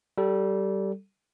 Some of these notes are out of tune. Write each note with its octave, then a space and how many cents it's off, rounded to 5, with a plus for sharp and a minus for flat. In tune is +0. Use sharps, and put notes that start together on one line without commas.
G3 -20 A4 +0